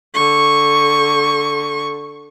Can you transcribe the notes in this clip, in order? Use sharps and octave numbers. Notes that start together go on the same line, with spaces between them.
D3 C#6